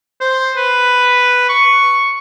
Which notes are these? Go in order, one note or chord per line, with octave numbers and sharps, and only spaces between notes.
C5
B4
C#6